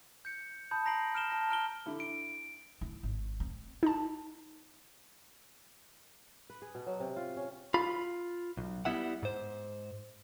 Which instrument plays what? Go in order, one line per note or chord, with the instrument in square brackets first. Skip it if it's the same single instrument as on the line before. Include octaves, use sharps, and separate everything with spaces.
[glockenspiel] G6 C#7
A5 B5 D#6 G6
A#5 A#6 C7 D7 F#7
F6 D7 E7 G7
A5 F6 A#6
A#5 F6 D7 G7
[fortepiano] D3 E4
[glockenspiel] D7
[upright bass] E4
G#1
C4
[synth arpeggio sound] D#4 A5
[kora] B4
G#4
B2
F#3
C3
F4
C#4
[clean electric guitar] F4 B5
B1
G3 B3 E4 E5 F#5
G#2 C5